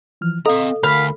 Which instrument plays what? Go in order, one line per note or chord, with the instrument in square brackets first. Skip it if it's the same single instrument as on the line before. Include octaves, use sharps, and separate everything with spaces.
[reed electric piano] E3 F3 F6
[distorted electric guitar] C4 A#5 [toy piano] A4 [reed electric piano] D#5 F5
[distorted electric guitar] D2 [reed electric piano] A#4 [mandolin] F5 B5